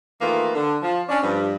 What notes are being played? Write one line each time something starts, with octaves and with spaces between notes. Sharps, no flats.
D#3 E3 A3 A#3 F4 B4
D3
F3
C#4 D4
G2 F3 G3